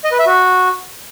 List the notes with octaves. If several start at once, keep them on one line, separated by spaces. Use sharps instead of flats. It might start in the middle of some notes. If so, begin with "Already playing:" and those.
D#5
B4
E5
F#4